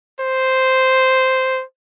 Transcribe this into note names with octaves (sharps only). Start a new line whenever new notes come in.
C5